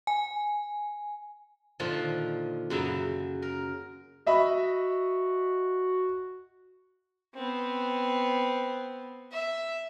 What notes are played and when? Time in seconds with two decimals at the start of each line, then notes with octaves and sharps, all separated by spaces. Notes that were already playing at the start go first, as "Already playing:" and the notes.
0.07 G#5
1.80 A#2 D3 D#3 F3
2.70 F#2 C#3 F#3 E5 B5
3.42 A#4
4.27 F#4 D#5 E5 B5
7.35 B3 C4
9.32 E5